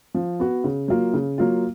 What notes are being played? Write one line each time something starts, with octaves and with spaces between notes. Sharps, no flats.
F3
B3 F#4
C#3
F#3 A#3 F4
C#3
F#3 A#3 F4